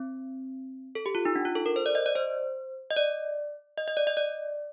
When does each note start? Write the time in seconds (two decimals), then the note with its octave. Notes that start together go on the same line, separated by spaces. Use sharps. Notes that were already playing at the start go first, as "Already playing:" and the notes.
Already playing: C4
0.95 A4
1.06 G4
1.15 F4
1.25 D#4
1.35 D4
1.45 F4
1.56 A4
1.66 A#4
1.76 C5
1.86 D5
1.95 D#5
2.06 D5
2.16 C5
2.90 D#5
2.96 D5
3.77 D#5
3.88 D#5
3.97 D5
4.07 D#5
4.17 D5